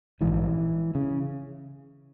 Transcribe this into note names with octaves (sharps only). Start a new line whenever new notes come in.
A#1 G#2 E3
C#3